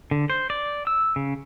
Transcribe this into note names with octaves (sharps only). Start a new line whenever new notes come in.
D3
C5
D5
E6
C#3